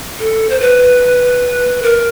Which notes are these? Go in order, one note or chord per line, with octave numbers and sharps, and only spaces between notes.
A4
C5
B4
A#4